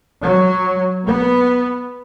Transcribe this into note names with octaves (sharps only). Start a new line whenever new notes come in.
F#3
B3